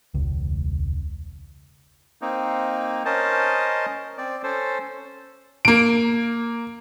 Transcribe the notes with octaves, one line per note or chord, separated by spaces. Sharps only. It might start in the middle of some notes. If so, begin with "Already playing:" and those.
E1 C#2
A#3 C4 D#4
C#4 A#4 C5 D#5 A5
C4 D5
C#4 A4 C5
A#3 D7